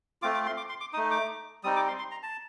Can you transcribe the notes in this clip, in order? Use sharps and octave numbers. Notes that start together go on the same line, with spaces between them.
A3 C4 F4 D6
D6
C6
D6
C6
D6
A3 D#4 D#6
D6
G3 C4 D#4 D#6
D6
C6
C6
A#5
A5